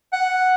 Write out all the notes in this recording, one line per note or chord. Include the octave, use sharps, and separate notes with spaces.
F#5